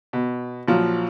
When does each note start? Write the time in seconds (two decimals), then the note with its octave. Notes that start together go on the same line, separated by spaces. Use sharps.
0.13 B2
0.68 A#1 F3 F#3